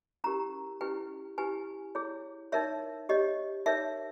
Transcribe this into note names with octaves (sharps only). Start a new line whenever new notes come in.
C#4 E4 G4 A#4 A#5
C#4 E4 G4 B4 G5
E4 G4 B4 G#5
E4 G#4 C#5
D#4 A#4 C#5 E5
G4 C#5 D#5
D#4 A#4 C#5 E5